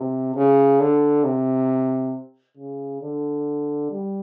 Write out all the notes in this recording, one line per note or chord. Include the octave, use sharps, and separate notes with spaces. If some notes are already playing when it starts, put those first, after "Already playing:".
Already playing: C3
C#3
D3
C3
C#3
D3
G3